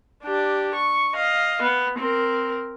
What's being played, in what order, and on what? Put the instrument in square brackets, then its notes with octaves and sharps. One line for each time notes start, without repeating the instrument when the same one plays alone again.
[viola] D4 G4
C#6
D#5 F5
B3
C4 A#4